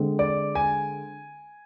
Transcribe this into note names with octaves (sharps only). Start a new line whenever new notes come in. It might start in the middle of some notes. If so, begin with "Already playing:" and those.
Already playing: D3 G#3 C4
D5
G#5